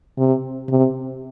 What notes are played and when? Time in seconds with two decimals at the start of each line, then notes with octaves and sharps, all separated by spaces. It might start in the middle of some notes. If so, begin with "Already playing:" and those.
0.18 C3
0.69 C3